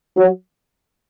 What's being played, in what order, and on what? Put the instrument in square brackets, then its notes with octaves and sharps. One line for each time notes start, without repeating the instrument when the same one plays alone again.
[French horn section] F#3